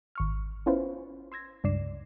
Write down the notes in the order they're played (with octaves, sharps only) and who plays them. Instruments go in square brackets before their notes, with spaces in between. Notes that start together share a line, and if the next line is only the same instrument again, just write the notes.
[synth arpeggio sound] G#1 C#6 F6
B3 C#4 E4 F4 B4 C5
C6 E6 G#6 A#6
C#2 G2 D5 C7 E7